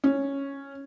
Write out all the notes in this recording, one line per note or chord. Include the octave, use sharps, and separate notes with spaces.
C#4